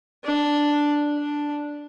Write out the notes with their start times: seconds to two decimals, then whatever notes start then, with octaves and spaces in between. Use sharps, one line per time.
0.24 D4
1.18 D4